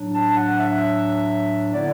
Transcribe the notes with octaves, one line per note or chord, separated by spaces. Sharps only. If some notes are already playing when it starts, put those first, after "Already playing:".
Already playing: A2 F#3 D4
A5
F#5
E5
D3 B3 E4 D5